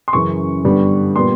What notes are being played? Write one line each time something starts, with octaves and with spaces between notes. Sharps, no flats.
C6
F#2 C#3 E3 C#6
G2 D3 G3 B3
A#2 G3 B3 C6